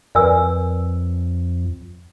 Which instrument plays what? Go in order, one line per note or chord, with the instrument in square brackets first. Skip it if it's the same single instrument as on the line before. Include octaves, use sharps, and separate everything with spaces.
[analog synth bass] F2 [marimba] A#4 B4 [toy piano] D5 G#5 E6